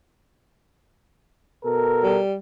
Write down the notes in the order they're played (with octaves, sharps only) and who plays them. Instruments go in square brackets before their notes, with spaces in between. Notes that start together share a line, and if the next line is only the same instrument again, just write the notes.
[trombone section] B2 A4 A#4
[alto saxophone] G3